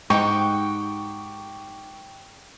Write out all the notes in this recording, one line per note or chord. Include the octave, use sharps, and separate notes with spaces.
G#2 D#4 G4 F#5 G5 C#6